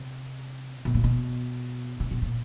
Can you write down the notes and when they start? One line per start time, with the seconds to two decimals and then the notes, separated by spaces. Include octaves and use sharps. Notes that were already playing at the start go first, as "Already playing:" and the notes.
Already playing: C3
0.85 B2
0.95 A#2
1.04 B2
2.00 C3
2.11 B2
2.22 A#2